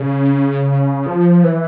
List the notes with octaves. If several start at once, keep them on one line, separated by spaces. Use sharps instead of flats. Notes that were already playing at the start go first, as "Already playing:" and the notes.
Already playing: C#3
F3
E3